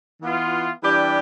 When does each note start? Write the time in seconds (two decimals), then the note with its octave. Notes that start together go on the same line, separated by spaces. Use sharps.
0.22 E3 B3 F4
0.82 E3 G3 D4 G4